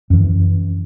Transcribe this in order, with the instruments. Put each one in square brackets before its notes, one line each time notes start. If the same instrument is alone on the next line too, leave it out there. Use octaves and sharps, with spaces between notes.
[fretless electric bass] F#2 E3